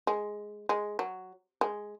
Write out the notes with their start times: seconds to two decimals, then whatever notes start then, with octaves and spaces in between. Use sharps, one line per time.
0.07 G#3
0.69 G#3
0.99 F#3
1.61 G#3